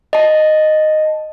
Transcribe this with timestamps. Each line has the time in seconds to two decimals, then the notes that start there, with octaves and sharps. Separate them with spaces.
0.13 D#5 A5